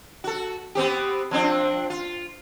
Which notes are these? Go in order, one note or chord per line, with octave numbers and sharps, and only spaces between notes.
F#4 A4
B3 C4 G4
F3 C4 D4
F4